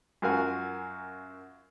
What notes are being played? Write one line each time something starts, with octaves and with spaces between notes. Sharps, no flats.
F#2 F4 F#4 A#4 G#5